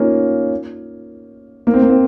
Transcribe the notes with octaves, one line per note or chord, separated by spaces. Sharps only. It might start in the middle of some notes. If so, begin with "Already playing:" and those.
Already playing: A#3 C#4 D#4 F4
A#3
C4
A#3
C4